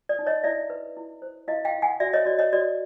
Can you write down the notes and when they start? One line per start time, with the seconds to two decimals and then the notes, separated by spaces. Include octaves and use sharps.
0.09 D5
0.19 D#4
0.27 C#5 D#5
0.44 E4 D5 E5
0.70 B4
0.97 E4
1.22 C5
1.48 E4 D#5 F5
1.65 F5 G5
1.74 E4
1.82 F#5 G#5
2.00 F#4 D5 E5
2.13 C#5 D#5
2.26 F#4 D5
2.39 C#5 D#5
2.53 F#4 D5